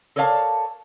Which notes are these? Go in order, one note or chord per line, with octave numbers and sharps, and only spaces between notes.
A4 A#4 C#5 D5 F5 A5